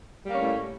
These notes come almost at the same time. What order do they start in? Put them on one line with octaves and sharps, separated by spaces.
G3 A#3 C#4 A2